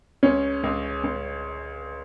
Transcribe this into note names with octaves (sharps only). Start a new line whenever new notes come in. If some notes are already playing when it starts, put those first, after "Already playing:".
C#2 C#4
C#2
C#2